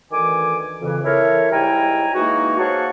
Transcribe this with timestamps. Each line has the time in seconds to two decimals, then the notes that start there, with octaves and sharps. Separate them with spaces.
0.11 D2 D#3 E3 G#5 D6
0.82 F2 C#3 E3
1.03 E4 A4 A#4 C#5
1.50 G#2 G3 E4 G5 G#5 A#5
2.14 E3 G#3 A#3 D#4 F#4
2.59 G#4 C5 C#5 F5 F#5 A5